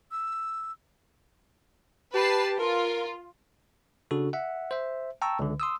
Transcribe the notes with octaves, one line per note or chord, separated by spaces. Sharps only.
E6
G4 B4 A5 C7
F4 A#4
C#3 D4 F#4 A4
E5 F#5
C5 E5
G5 A5 A#5 C#6 E6
C#2 D3
C6 D#6 E6